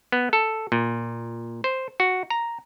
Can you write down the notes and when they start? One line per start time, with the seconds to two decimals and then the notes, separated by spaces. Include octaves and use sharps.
0.12 B3
0.33 A4
0.72 A#2
1.64 C5
2.00 F#4
2.30 A#5